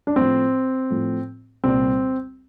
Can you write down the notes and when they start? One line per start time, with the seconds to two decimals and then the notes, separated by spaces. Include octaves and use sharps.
0.07 D4
0.16 A2 F3 C4
0.90 A2 F3
1.64 C2 A#2 G3 C4